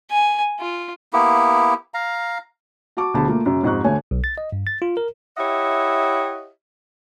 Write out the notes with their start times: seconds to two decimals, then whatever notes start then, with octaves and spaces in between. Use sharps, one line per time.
0.11 G#5
0.60 F4
1.13 A#3 B3 E4 G4
1.94 F5 A#5
2.97 F#4 A5 C#6 D6
3.14 D2 B2 F#3 G#4 A5 B5
3.26 A3 A#3 F4
3.46 F#2 C#3 C#4
3.63 F2 G#2 D#4 G4 C#6 F#6
3.84 D2 A3 C#5 G#5
4.11 B1
4.24 A6
4.38 D#5
4.52 G2
4.67 A6
4.82 F4
4.97 A#4
5.38 E4 G4 C#5 D#5 E5 F#5